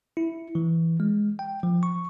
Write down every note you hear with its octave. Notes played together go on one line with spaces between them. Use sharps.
E4
E3
G#3
G5
F3
C#6